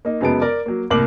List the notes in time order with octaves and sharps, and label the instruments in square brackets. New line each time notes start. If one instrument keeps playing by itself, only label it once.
[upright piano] A#3 D#4
F#2 C#3 G#3 B3 A5 D7
A#4 D5
F#3 A#3
C2 A2 A#3 A#4 D6 F#7